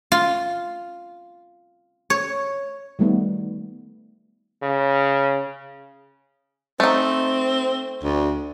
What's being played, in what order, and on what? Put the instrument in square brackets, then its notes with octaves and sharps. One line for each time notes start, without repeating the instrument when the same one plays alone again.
[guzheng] F4
C#5
[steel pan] D#3 G3 A3 B3
[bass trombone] C#3
[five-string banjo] A3 D#4 [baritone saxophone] C4
[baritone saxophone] D2